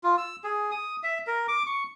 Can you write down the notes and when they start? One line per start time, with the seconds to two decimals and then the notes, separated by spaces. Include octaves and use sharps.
0.04 F4
0.18 E6
0.44 G#4
0.71 D#6
1.03 E5
1.27 A#4
1.48 D6
1.67 C#6